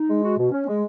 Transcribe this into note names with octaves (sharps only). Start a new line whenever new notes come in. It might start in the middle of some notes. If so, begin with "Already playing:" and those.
Already playing: D#4
G#3
F#4
B2
C#4
G#3